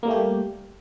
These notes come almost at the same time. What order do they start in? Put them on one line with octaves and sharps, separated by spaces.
A#3 G3 A3 G4